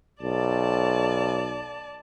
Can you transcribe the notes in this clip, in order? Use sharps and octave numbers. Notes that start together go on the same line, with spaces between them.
B1 D5 A5